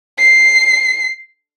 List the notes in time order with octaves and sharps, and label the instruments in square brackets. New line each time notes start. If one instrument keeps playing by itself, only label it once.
[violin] C7